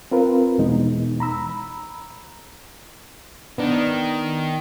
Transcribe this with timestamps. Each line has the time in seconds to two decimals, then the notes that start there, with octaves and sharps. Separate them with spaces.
0.11 C4 F4 A#4 B4
0.58 E2 B2 E3 G#3 B3 D#4
1.20 A#5 B5 E6
3.58 D#3 B3 D4